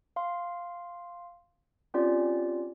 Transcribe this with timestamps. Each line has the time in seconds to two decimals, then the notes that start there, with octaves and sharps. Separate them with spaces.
0.16 F5 C6
1.94 C4 C#4 F4 G4 D5